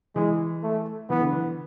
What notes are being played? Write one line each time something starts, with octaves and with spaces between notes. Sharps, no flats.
E3 G#3
A3
E3 B3
D3
E3